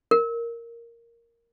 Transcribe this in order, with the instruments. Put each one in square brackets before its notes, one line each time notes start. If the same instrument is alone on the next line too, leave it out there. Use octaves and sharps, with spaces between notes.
[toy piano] A#4